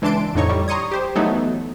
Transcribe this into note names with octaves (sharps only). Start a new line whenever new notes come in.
C#2 E3 D4 A5 C6 D7
F2 A2 D3 D#4 C#5 C#6
G3
A#5 C6 C#6 D#6 G#6
G4 C5
E3 F#3 A3 B3 D#4